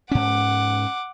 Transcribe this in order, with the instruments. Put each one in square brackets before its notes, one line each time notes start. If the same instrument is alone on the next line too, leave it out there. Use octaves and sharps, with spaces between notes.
[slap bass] G#2 C#4 [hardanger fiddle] F#5 D6